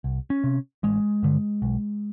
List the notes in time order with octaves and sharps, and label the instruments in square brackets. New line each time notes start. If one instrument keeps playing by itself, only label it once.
[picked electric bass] C2
C#4
C3
A1 G#3
G2 D3
B1